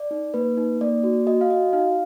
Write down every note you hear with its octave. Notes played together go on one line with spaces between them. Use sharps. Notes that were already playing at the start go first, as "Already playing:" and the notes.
Already playing: D5
D#4
A#3 B4
D#4
A#3 D5
F#4
F#4 D#5
F5
F#4 D#5
D#4 F5